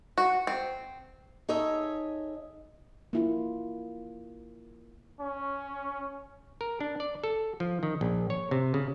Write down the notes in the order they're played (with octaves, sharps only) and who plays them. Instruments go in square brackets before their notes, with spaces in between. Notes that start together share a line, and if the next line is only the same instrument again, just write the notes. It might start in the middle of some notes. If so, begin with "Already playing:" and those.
[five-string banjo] F#4
C4
[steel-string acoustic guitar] D#4 G#4 A4 C#5 D#5 E5
[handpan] A#3 E4 F4
[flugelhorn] C#4
[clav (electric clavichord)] A#4
D4
D5
A4
F3
D#3
A#1
C#5
C3
C#3